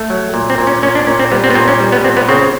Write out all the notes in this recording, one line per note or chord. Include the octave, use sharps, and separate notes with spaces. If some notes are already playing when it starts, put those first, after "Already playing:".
Already playing: A3
F#3
A#2
C4
A#2
C#4
A#2 C#4
D4
A#2 C#4
C4
G3 B3
C4
B3
A#2 C4
C#4
G3
B3
A#2 C4
B3
C#3 C4